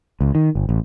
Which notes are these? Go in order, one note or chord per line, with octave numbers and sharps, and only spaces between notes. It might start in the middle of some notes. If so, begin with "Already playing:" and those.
C#2
D#3
G1
A1